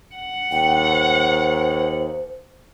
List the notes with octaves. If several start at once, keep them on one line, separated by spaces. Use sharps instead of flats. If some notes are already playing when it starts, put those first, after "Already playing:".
F#5
D#2 G5
C5